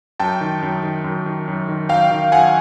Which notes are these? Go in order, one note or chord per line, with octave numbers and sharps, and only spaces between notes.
F#2 G5 A5
D#3
F#2
D#3
F#2
D#3
F#2
D#3
F#2 F5 G5
D#3
F#2 F#5 G#5